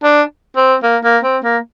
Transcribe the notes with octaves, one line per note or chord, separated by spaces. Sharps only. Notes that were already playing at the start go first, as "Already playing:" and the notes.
D4
C4
A#3
A#3
C4
A#3